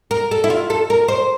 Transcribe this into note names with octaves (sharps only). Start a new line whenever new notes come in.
A#4
A4
E4
F4
A4
A#4
C5